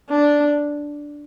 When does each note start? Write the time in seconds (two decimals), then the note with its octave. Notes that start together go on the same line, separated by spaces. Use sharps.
0.10 D4